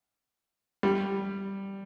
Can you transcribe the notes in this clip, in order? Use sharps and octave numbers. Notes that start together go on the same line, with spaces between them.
G3